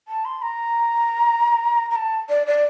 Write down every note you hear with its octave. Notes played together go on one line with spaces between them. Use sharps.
A5
C6
A#5
A#5
A5
D5
D5